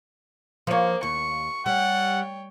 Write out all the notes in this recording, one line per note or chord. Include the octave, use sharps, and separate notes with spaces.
F3 A#3 C#5
D#2 C#6
G3 C#5 F#5 G5